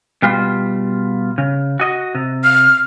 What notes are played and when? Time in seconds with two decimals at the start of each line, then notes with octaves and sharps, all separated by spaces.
0.22 B2 G3 F4
1.38 C#3
1.80 F#4 D#5
2.15 C3
2.44 F6